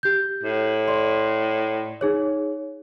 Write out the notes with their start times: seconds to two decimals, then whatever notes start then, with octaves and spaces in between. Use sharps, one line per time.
0.03 G4 G6
0.43 A2
0.88 D5 C6
2.01 D#4 G#4 C#5